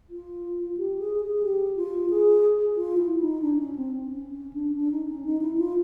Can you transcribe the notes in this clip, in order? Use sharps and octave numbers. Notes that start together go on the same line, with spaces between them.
F4
G4
G#4
G#4
G4
F4
G#4
F4
E4
D#4
D4
C#4
C4
C#4
C#4
D4
D4
D#4
C#4
D#4
E4
F4